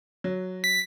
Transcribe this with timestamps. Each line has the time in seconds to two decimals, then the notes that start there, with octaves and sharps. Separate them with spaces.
0.24 F#3
0.64 B6